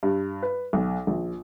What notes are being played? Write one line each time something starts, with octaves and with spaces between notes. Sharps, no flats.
G2
B4
B1
A#1